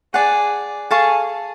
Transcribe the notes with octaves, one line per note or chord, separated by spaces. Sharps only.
G#4 D5 F#5 A5
G#4 A4 F5 A5 C#6